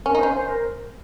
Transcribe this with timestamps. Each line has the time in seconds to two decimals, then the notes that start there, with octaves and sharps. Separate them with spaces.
0.06 C#4 A#4
0.15 D#4
0.20 C#4 C5
0.34 C5
0.48 A#4